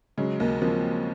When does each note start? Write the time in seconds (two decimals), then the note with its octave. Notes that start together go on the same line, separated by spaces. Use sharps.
0.18 C#3 F#3 G#3
0.40 D#2 G#3 A#3
0.61 F3 A#3 C4